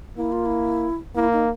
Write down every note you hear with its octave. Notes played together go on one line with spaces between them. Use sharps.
A#3 E4
F4
E4
A#3 E4
D#4